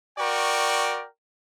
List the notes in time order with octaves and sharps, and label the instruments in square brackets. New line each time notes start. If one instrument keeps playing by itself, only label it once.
[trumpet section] F#4 A#4 D5 G5 C#6